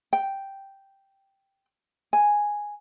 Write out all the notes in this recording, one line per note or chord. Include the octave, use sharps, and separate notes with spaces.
G5
G#5